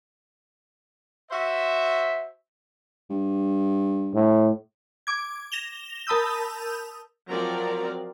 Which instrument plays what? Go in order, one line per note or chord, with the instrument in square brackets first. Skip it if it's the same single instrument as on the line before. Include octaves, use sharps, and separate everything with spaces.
[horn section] F#4 C5 E5
[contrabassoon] G2
[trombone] A2
[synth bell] D6 G#6
A#6 E7 F7 G7
A#4 A5 B5 D#6 E6 G6
[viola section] F3 F#3 C4 A#4 D5 A#5